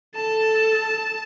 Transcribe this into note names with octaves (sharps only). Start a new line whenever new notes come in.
A4 A5